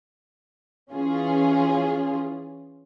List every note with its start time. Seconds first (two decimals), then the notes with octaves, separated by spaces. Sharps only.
0.91 E3 C#4 F4 G#4